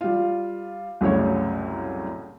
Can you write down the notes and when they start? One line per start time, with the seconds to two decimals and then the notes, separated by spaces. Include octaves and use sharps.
0.01 G3 F4
1.01 C2 F#2 A2 C#3 G3 C#5